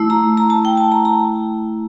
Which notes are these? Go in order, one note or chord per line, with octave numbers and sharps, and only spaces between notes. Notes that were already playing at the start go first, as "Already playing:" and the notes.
Already playing: A3 E4
A#5
A#5
A5
G5
A5
A#5
A#5